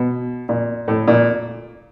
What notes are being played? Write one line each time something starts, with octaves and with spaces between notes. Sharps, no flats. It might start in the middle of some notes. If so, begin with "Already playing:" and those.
Already playing: B2
A#2
A2
A#2